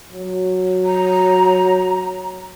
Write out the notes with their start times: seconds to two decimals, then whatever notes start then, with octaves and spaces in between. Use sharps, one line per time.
0.12 F#3
0.85 A#5